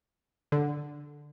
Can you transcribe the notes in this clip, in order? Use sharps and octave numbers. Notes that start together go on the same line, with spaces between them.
D3